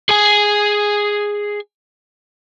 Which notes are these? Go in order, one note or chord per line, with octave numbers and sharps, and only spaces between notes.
G#4 G#5